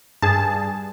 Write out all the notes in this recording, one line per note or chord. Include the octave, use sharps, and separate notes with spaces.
G2 G#4 A5